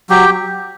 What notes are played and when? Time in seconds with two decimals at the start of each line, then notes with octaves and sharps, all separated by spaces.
0.10 F#3 G4